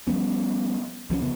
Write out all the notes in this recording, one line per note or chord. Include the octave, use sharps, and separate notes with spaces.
F3 G3 B3 C#4
C2 F3 G3 C#4
F1 G2 C#3 B3